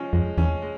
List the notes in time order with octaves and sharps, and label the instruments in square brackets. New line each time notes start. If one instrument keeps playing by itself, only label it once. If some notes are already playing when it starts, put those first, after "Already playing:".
Already playing: [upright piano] F3 G#3 C#4
[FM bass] F2 [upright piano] G#3
[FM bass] E2 [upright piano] C#4
[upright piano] G#3